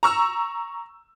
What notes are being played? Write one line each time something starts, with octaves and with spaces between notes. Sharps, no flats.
A#5 C#6 E6